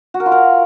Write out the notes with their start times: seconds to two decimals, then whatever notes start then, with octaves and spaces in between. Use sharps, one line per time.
0.14 F#4
0.20 A#4
0.26 F4
0.32 A#4